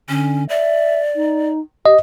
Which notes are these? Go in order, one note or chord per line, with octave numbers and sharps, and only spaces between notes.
D3 C#4
D5 E5
D#4
G4 D#5